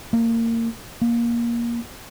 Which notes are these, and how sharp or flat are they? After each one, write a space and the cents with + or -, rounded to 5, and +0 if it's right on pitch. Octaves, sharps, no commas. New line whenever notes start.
A#3 -25
A#3 +15